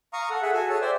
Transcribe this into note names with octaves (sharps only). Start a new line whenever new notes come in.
F5 A#5 C#6 D#6
A4 F#5
G#4 E5 F#5
F#4 A4 G#5
G#4 C#5 A5 E6
C5 D5 E5 G5